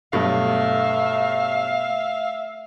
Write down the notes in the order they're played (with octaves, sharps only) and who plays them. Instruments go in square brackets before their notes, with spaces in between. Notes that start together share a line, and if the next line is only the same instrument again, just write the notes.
[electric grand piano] G2 B2 F#3 [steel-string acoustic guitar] A3 [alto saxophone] E5 [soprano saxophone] F5